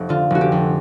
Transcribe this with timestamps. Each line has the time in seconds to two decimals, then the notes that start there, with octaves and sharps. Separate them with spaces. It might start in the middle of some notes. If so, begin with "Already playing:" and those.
Already playing: F1
0.09 D3 F4
0.30 F1 F#4
0.41 G4
0.52 F2